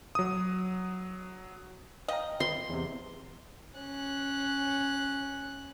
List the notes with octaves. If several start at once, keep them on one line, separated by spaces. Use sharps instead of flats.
F#3 D#6
D#5 F5 G5 A#5
B4 C6
E2 C3
C#4 F#6